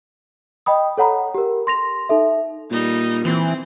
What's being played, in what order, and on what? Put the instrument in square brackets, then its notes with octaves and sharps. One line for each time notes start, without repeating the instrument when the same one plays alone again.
[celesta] D#5 G5 B5 D#6
A4 C#5 F#5 A#5 B5
G4 A#4
C6 A#6 F7
D#4 A4 E5
[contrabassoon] A#2 [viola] G3 D#4
[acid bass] E3 [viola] C4